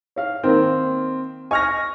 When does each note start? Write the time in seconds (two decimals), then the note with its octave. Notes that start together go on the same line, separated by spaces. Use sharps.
0.16 C#5 F5
0.43 D#3 A#3 C4
1.51 D#5 G#5 C#6 F6 A#6